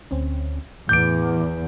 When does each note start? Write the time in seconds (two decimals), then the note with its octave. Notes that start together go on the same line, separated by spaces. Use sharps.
0.11 D2 C4 C#4
0.89 E2 A2 D6 G6 D7